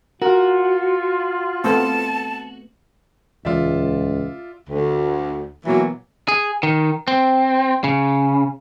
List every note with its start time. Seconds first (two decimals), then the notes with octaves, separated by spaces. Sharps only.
0.22 F4 F#4 A#4
1.64 A3 B3 C4 A5
3.45 D#1 C#2 E3 G#3 F4 D5 E5
4.69 D2
5.66 B2 E3 F#3 A#3
6.28 G#4
6.63 D#3
7.08 C4
7.84 C#3